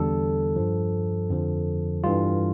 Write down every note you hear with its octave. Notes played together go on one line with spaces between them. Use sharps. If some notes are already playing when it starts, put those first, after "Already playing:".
Already playing: E2 D3 G3 A4
G2 F3
F2 D3 F3
G2 E3 G3 F4